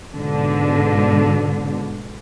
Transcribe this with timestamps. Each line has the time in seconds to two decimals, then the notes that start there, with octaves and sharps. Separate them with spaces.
0.15 G#2 B2 D3